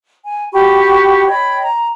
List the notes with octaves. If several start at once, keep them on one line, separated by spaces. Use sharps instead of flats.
G#5
F#4 G4 B5 C#6
C#5 D#5 G5 B5
A#5